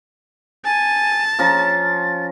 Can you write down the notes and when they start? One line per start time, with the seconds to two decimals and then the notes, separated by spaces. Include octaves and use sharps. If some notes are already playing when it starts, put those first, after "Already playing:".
0.65 G#5 A5
1.39 F3 C#4 A#5 A6